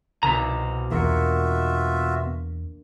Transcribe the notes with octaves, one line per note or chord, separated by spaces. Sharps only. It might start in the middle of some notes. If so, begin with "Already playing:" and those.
C2 B2 A#5
E2 A#3 D4 F4 F#4 E5 C#7